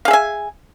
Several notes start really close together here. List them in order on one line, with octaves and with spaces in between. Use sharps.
F5 G#4 E5 G#5